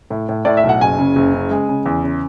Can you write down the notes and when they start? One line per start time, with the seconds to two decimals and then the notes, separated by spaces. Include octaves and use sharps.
0.10 A2
0.29 A2
0.45 A2 D5
0.57 E5
0.63 B1
0.69 F#5
0.81 F#1 G#5
0.99 C#3
1.16 F#1
1.34 C#3
1.51 G#3
1.69 C#3
1.86 E2
2.03 C#3